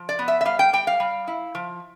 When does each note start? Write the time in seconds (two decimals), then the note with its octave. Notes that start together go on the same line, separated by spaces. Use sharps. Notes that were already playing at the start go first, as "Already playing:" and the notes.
Already playing: F3
0.09 D5
0.19 B3
0.28 E5
0.41 E5
0.45 G3 F5
0.59 G5
0.73 G3 G5
0.87 F5
1.00 G3
1.28 E4
1.55 F3